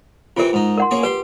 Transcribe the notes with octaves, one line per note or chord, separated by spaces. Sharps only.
C3 E3 C4 F4 A#4
G#2 D#4
A#4 F#5 C6
A#3 C#4 G#4
G4 B4 C6